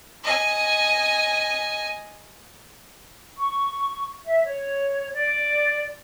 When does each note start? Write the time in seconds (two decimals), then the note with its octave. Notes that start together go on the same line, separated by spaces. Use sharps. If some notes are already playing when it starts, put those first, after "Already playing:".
0.24 D#5 G#5
3.38 C#6
4.24 E5
4.45 C#5
5.11 D5